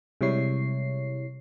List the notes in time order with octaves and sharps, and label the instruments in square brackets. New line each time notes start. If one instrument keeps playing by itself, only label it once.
[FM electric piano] C3 G3 G#3 E4 C#5 C7